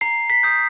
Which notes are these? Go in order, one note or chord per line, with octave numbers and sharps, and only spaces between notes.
A#5 C7
B6
D#6 G6